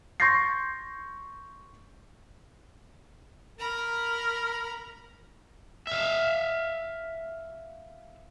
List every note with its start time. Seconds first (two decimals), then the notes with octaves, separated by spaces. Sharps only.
0.20 C6 C#6 G6 A6 A#6 C7
3.59 A#4 A#5 B5
5.87 E5 F5